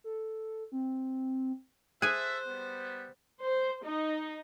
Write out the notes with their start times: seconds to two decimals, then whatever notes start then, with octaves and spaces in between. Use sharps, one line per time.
0.04 A4
0.72 C4
2.02 G#4 A4 C5 E5 G#5 F#6
2.47 G3 B3
3.41 C5
3.83 D#4